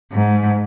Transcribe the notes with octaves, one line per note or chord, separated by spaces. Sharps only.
G#2